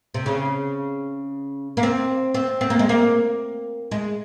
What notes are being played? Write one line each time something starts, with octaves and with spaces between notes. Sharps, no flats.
C3
C#3
A#3
C4
C4
C4
A#3
G#3
A#3
G#3